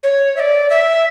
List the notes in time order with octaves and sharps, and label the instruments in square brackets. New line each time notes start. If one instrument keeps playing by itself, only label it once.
[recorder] C#5
E5
D5
E5